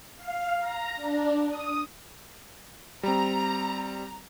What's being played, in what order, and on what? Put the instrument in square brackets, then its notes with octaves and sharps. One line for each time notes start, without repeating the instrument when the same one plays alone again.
[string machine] F5
A#5
D4
D#6
[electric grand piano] G3 C4 [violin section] A#5